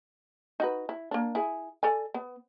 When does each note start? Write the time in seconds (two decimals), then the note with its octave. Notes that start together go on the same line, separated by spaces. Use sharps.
0.60 D#4 F#4 B4
0.89 E4
1.11 A#3 D4
1.35 E4 G#4
1.83 A4 D5 G#5
2.14 B3